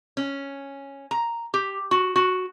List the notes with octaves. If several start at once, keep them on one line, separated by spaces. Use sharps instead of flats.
C#4
A#5
G4
F#4
F#4